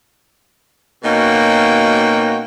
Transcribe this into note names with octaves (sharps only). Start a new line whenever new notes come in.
B2 A#3 C#4 D#4 F#4 G5